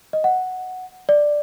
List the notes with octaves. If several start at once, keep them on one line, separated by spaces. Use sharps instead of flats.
D#5
F#5
D5